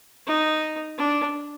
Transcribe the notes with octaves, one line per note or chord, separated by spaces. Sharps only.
D#4
D4